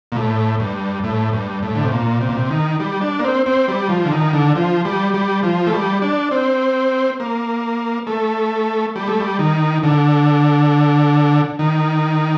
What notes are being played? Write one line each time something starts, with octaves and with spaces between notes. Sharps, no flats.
A#2
A2
G2
A2
G2
A2
D3
C3
A#2
C3
A#2
C3
D#3
G3
D4
A#3
C4
C4
G3
F3
D3
D#3
D3
F3
G3
G3
F3
A3
G3
D4
C4
A#3
A3
G3
A3
G3
D#3
D3
D#3